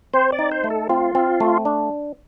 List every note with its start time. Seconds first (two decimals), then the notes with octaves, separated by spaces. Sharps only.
0.14 C4 C5
0.32 D5
0.39 D#4
0.52 C5
0.64 A3
0.70 A4
0.89 C4 F4
1.15 C4
1.40 A3
1.65 D4